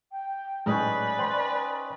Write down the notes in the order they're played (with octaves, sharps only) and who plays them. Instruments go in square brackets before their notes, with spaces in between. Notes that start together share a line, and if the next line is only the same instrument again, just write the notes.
[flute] G5
[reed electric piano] A2 F#3 G#3 [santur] C#4 D#4 D#5 [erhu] B4 [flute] D5
[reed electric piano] C5 G5 C6